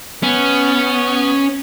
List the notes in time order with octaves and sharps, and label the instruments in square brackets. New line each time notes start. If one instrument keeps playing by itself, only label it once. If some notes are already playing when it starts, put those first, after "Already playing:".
[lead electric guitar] B3 [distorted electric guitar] C#4